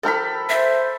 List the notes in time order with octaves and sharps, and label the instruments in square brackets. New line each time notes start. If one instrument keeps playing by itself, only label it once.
[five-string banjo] F3 G4 A#4 [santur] A4 B5
[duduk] C5 [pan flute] E5